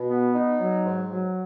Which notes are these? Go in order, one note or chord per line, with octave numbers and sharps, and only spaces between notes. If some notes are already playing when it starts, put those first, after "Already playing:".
Already playing: B2
B3
D#4
F#3
G#2
F#3